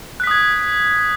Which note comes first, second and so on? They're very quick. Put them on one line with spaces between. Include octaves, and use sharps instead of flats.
F#6 B6 D#6 G#6